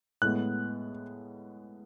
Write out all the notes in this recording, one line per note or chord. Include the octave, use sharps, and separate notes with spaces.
A2 G#3 B3 F#6